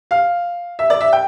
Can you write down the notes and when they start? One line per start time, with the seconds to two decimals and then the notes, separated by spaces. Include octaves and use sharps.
0.11 F5
0.79 E5
0.90 D5
1.01 E5
1.13 G5